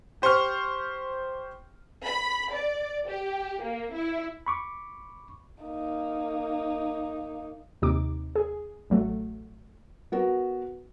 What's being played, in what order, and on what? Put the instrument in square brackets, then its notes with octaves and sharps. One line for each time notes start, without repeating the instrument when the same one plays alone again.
[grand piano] G4 C5 C6 C#6 F6
[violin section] B5
D5
G4
A#3
E4
[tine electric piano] B5 C#6 D6
[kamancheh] A#3 D#4
[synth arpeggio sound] D#2 C3 D#4 D6
G#4
A1 F#3 A3
[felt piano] B3 F#4 A#4